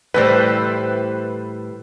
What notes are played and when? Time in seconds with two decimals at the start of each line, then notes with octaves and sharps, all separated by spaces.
0.14 A2 E3 G3 B4 C5